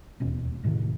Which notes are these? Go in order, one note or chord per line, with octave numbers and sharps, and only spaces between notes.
E1 D#2 B2 C#4
E1 A2 C3 D#3